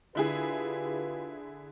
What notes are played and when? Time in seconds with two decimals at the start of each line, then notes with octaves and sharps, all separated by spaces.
0.15 D3 E4 F4 G4 G#4 B4